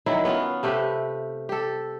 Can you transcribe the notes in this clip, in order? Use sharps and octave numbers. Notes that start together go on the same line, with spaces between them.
D#3 F#3 E4
B3 C#4 F4
C3 A3 G4 B4
G4 A4